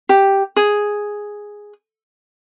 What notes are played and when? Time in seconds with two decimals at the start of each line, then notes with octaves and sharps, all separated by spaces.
0.09 G4
0.56 G#4